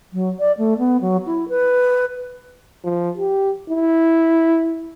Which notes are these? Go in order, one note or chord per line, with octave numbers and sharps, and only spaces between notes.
F#3
D5
A3
B3
F#3
E4
B4
F3
G4
E4